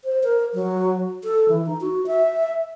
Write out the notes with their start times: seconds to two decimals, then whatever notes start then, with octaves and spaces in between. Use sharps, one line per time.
0.04 C5
0.24 A#4
0.54 F#3
1.24 A4
1.49 E3
1.66 D#4
1.81 F#4
2.07 E5